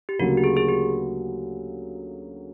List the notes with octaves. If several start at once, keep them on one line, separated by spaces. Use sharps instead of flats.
G4
D2 C#3 F#3 A#3 F#4
G4
G#4
G#4
G4